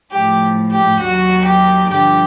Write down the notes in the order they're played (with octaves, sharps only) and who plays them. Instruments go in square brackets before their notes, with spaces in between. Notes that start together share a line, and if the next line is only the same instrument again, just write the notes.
[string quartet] A2 F3 G4
G4
D#2 D#3 F#3 F#4
G4
G2 D3 F3 G4